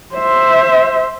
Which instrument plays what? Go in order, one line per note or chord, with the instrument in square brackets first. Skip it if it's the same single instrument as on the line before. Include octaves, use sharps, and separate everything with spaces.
[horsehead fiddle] C5 E5